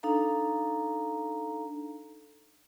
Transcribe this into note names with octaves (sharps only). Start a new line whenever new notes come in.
D4 D#4 A4 F5 A#5